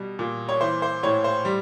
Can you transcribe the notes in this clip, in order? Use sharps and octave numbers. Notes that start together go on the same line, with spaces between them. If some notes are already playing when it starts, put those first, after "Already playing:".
Already playing: B2 G3
A#2
C#5
E3 C5
C5
A2 C#5
C5
G3